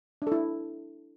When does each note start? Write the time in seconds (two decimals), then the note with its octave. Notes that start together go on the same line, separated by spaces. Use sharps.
0.22 D4
0.27 A4
0.32 E4